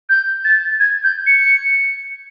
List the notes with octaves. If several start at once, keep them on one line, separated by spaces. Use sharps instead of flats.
G6
A6
G#6
G6
C#7